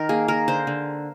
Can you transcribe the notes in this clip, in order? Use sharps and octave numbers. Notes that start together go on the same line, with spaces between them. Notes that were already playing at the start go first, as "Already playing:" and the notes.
Already playing: D#3 A#4
A#3 G#4
A#3 A#4
D3 C5
D3